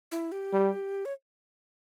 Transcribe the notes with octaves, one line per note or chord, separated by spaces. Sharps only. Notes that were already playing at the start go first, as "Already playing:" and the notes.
E4
G4
G3
C#5